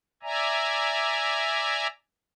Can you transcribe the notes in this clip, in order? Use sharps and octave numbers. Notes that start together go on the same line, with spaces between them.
D5 E5 G#5 A#5